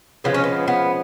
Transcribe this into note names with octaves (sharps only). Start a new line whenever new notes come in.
C#3 F3 G#3 B3
C#4
B3
B3